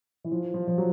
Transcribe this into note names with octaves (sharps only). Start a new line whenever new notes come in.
E3
F3
F3
F3
F#3